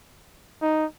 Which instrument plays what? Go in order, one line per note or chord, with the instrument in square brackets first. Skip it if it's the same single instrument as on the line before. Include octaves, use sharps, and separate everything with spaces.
[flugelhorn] D#4